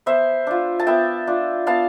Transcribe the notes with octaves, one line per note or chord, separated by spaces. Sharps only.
B3 C5 E5
D4 F4
A5
B3 E5 G5
D4 F4
B3 F5 A5